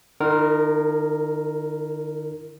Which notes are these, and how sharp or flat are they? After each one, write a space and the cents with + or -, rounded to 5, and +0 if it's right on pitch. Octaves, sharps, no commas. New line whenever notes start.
D#3 -45 E4 +0 A#4 +0